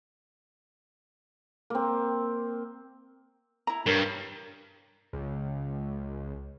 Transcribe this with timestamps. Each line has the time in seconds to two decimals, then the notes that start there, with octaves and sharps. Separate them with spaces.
1.70 A#3 C4
3.67 E4 A#5
3.86 G2 A#4 C#5
5.13 C#2